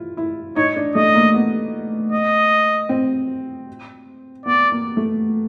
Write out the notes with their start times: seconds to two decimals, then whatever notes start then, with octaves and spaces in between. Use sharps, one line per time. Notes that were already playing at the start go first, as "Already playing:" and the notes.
Already playing: E4 F4
0.17 E4
0.56 D#4 C#5
0.76 D4
0.95 A3 D#5
1.15 A#3
1.34 B3
2.12 D#5
2.89 C4
4.46 B3 D5
4.72 A#3
4.97 A3